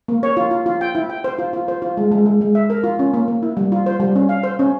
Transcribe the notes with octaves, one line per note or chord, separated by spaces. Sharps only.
A#3
C#5
F4
F4
F4
G5
E4
G5
C5
F4
F4
C5
F4
G#3
G#3
G#3
G#3
E5
A#4
F4
C#4
A#3
A#3
E4
G3
F4
C5
G3
C#4
F5
C5
C#4